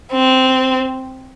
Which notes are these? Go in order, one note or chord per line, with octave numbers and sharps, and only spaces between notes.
C4